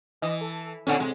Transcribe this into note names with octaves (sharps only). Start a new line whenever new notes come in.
E3 D#5
A4
A#2 D3 C4 C#4 A4 C#5 F#5
C3 G#3